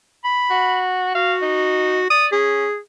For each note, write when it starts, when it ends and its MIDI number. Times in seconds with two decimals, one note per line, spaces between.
0.24 0.81 83
0.50 1.11 66
1.15 2.06 66
1.15 1.34 77
1.42 2.04 63
2.10 2.30 74
2.10 2.27 87
2.32 2.66 61
2.32 2.78 68